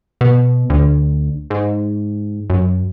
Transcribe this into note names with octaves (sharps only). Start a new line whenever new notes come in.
B2
D2
G#2
F#2